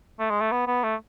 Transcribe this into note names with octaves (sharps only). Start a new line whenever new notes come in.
A3
G#3
A3
B3
B3
A3